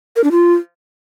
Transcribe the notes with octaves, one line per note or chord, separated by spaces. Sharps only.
A#4
D4
F4